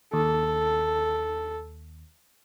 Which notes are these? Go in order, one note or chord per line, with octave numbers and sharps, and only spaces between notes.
D#2 A4